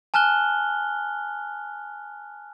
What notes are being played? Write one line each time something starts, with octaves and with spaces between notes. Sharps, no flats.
G#5 A5 F6 F#6 G7